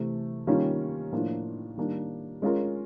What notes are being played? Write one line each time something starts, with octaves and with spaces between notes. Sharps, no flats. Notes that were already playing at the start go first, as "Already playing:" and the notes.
Already playing: C3 E3 A3
D#3 G3 A#3 C#4 F4
A2 F3 A#3 D4 F4
D#3 G3 A#3 D4
G#3 C#4 F4 A#4